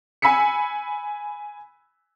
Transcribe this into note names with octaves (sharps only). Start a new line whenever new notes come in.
G#5 B5 E6 B6 C#7